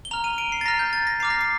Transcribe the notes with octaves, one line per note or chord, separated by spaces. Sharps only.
G7
A#5 F6 F7
D#7
D7
C7
A6
A#5 F6 A#6
G6
A6
A#6
A#5 D6 F6 C7
A#6
C7